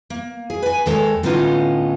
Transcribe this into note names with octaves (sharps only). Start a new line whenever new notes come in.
A#3
G#4
B4 G#5
D#2 G#3 A4 C#5
A2 D3 B3 C#4 D#4 F4